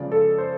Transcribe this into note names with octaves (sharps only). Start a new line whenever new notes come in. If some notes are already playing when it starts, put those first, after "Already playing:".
Already playing: C#3 F3 G#3 D5
A4
C5